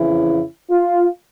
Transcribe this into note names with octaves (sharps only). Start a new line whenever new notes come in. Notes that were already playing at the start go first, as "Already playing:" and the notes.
Already playing: F2 C#3 E3 E4
F4